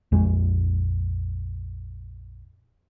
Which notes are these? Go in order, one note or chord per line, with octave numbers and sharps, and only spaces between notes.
A#1 F2 G#3